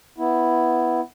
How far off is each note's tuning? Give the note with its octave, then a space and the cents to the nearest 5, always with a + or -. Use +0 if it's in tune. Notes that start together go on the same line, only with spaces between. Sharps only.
B3 +0 E4 +0